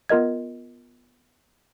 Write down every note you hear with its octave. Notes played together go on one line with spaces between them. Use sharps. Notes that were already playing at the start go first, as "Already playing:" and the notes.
B3 F4 A#4 D#5 G#6